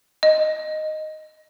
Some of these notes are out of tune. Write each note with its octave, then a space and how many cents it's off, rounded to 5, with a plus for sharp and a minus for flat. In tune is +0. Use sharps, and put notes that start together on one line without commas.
D#5 -5